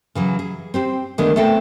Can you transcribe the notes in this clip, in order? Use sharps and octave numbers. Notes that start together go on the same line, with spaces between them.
C#3 E3 F#3
G#4
C4 G4 C5
D3 D#3 G#3 A3 B3 D4
A3 B3 C4 A4 C5 G5